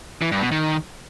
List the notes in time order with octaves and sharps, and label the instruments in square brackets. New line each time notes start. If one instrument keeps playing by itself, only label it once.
[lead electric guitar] E3
G2
B2
D#3